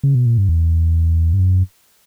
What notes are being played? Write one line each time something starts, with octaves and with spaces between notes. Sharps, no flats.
C#3
B2
A#2
G2
E2
G2
F#2